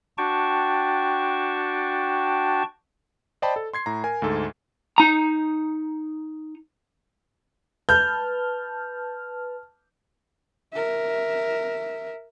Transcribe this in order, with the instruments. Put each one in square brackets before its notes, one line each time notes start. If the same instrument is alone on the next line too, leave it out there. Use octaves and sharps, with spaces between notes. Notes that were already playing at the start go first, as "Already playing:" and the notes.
[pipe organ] D4 F#4 G5 A5 C#6
[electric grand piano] C5 D5 D#5 G5 A5 B5
A4
C6 G#6 C7
A2 A#5
A#4 G#5
D2 G#2 A4
[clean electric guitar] D#4 A#5
[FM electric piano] B4 A5 F6 [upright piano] G6
[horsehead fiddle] A#4 E5